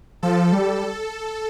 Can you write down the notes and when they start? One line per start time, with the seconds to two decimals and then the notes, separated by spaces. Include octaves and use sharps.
0.23 F3 A4
0.53 G3